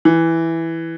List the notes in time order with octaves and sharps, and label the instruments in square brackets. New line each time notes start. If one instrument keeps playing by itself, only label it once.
[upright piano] E3